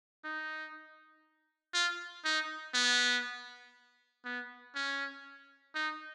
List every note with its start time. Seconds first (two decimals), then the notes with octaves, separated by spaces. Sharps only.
0.24 D#4
1.74 F4
2.25 D#4
2.74 B3
4.25 B3
4.75 C#4
5.75 D#4